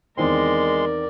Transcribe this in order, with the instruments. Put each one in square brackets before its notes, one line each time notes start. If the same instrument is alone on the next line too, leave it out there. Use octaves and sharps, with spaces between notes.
[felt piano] E2 D#3 C4 [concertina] G#3 C6 [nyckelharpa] A#4 D5